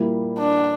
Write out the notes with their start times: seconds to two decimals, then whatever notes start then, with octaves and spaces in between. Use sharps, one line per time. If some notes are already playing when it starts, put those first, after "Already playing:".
Already playing: A#2 G3 A#3 E4
0.38 D4